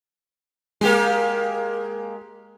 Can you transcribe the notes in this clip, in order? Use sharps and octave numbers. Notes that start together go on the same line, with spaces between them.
G#3 A#3 G4 G#4